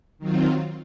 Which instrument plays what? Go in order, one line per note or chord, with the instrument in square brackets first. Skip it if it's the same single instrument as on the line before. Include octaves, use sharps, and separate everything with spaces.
[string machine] D#3 F#3 C4 F4